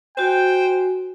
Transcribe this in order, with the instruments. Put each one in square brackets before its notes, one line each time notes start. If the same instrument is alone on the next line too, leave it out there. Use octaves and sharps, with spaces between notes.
[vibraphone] F#4 G#5 [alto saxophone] C5 [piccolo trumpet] G5